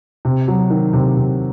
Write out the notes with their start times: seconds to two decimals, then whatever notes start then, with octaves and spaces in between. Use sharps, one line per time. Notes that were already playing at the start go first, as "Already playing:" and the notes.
0.25 C3
0.48 F#3
0.70 D#3
0.93 C3
1.17 C3